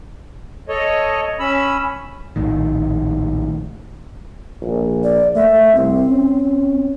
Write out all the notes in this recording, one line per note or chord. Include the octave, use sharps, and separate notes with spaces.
A4 C#5 D#5
C#4 B5 E6
A#1 A2 D#3
A#1
D5
A3 E5
C2 C4
C#4